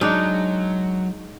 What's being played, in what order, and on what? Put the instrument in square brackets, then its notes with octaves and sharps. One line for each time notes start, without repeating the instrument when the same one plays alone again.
[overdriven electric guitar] F#3 [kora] G#3 D4 [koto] D#4